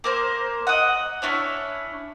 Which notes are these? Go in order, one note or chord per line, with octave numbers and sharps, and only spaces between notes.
A#3 A#4 C5
D#5 F#5
C#4 D4 E4 C#5